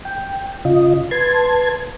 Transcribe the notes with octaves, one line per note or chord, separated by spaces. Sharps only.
G5
C#3 F4 D#5
B4 A5 C6 G#6